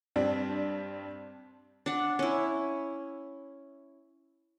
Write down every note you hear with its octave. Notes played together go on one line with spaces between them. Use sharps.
G2 G3 C4 D4
D4 F#5
C#4 E4